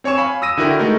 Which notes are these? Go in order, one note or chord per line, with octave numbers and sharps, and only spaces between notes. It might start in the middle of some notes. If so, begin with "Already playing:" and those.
C4 C#5 G#5 C#6 E7
F5 G#5 B5
D#6 E6 A#6 D#7
D3 E4 F#4 A#4 G5
G#3 A3 D#4 A#4